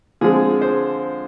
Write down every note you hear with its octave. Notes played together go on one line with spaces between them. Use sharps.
D3 F3 G#3 C4 G#4
C5